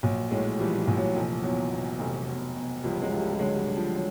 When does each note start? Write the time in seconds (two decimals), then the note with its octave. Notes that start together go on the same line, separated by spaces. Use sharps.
0.03 A#1 F#3
0.31 A2 F#3 G#3
0.59 E3 F3 G3
0.78 F3
0.87 A#1
0.97 F#3
1.15 F1 F3
1.43 E2 F#3
1.71 B2
1.99 F1
2.27 B2
2.55 B2
2.83 C#2 F3 G3
3.02 F#3 G#3
3.11 C#2
3.20 G3 A3
3.33 G3
3.39 D3 F#3 G#3
3.53 G3
3.58 F#3
3.67 D3
3.77 F3
3.95 F#3